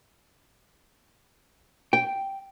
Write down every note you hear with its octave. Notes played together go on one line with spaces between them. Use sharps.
G5